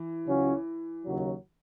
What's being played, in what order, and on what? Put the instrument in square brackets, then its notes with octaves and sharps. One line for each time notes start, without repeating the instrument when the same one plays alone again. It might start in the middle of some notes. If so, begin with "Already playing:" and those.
Already playing: [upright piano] E3
[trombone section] C#2 C#3 F#3 C#4 F#4
D#2 C#3 F#3